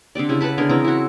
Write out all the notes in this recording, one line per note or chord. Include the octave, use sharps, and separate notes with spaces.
D3 C4 G4 D5
C#3 E4 G4
B4 F#5 A5 B5
D3 B3 G#4 A#4
C#3 E3 C4 A#5
E4 F#4